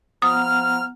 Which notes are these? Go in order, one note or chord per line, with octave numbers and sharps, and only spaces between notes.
F3 B3 F#5 A#5 D#6 F6